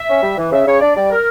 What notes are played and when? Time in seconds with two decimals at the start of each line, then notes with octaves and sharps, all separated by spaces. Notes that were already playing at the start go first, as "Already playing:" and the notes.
Already playing: E5
0.09 C#4
0.22 G3
0.37 E3
0.52 C#3 E5
0.66 C#3 C#5
0.80 D4 D5
0.95 G3 D5
1.09 A#4